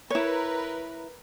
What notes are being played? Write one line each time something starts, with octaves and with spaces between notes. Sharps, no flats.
E4 A#4 B4 C#5